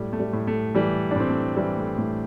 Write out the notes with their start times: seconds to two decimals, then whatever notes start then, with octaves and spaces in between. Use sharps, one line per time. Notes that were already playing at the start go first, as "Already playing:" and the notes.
Already playing: A2 G3
0.13 A3
0.20 G3
0.33 A2
0.47 A3
0.74 E3 G3
1.11 D4
1.16 A2 C4
1.29 A3
1.57 E3 G3
1.77 A3
1.98 A2 A3